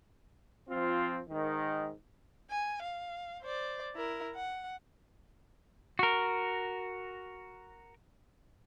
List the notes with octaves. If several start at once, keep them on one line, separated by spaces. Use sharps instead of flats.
F3 C4 F4
G#2 D#3
G#5
F5
C5 D5
E4 A#4
F#5
F#4 A#4